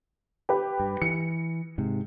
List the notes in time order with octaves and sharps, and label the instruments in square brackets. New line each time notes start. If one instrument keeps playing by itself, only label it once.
[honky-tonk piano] G4 B4
[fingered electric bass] G2
[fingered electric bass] E3 [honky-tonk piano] C#7
[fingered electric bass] G#2 C3